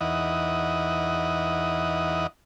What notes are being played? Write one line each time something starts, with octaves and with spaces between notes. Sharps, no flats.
E2 E3 D#4 D#5 F#5